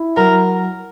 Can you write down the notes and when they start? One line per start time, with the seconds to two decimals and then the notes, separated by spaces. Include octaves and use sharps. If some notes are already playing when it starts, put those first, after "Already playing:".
Already playing: E4
0.16 F#3 A#4